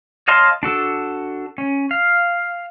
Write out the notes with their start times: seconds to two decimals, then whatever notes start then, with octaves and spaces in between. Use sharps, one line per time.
0.28 C#5 D#5 F5 A5 C6
0.63 D4 F#4 A4
1.58 C#4
1.91 F5